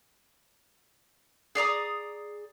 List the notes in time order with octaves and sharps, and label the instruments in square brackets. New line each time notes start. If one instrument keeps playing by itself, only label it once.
[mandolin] G#4 D5 A#5 D#6